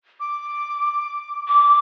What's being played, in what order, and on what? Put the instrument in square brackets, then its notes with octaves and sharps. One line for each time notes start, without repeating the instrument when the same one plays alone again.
[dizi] D6
[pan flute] D6